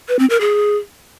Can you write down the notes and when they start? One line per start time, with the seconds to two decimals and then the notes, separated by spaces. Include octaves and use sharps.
0.08 B4
0.19 C4
0.30 A#4
0.41 G#4